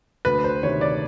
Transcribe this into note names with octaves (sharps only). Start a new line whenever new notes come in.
D2 B4
C5
C3 D#3 C#5
D5